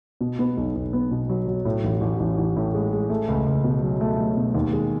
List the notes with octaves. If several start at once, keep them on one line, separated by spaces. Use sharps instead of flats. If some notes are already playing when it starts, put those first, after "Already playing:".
B2
B3
B1
B1
B3
B2
F#3
F#3
A2
A1
A1
A1
A1
A2
G#3
G#3
A3
C#2
C#2
B2
F#3
A3
F#3
B2
D#2
G#3